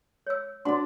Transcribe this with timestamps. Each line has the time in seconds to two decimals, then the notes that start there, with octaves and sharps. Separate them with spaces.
0.27 C#5 E6
0.65 D4 F#4 D5 F#5 C6